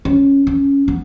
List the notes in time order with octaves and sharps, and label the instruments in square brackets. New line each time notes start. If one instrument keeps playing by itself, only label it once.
[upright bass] C#4
C#4
B3